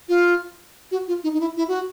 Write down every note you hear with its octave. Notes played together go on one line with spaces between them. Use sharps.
F4
F#4
F4
D#4
D#4
E4
E4
F#4